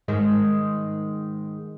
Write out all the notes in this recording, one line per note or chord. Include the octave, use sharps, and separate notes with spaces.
G#2 D#3 G#3